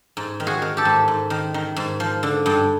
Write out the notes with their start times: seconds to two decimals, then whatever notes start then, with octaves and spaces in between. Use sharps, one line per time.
0.17 G#2
0.40 D#3
0.47 F#4 G#4
0.62 D#3
0.77 G4 A4
0.85 G#2
1.08 G#2
1.30 D#3
1.54 D#3
1.76 G#2
2.00 F3
2.23 D3
2.46 G2